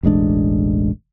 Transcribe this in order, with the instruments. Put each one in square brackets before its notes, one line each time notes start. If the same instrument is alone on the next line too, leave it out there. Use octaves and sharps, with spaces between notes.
[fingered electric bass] E1 A1 G#3 D4